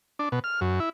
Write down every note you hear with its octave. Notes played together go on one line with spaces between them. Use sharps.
D4
B2
F6
F#2
E4